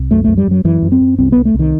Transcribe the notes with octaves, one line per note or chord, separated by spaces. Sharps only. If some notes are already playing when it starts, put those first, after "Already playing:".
Already playing: C2
F#2 A3
F#2 A3
G3
F#2 F#3
F#2 E3
F#2
C4
F#2
C2 C4
C2 B3
A3
C2 D#3